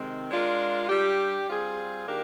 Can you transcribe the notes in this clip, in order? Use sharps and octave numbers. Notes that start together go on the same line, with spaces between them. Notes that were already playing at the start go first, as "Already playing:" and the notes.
Already playing: C3 D#3 G#3 C4
G#3 D4 F4 A#4
G3 D4 G4
G3 C4 F4 G#4
D#3 A#3 D4 G4 A#4